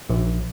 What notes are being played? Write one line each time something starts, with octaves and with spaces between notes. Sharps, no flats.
A#1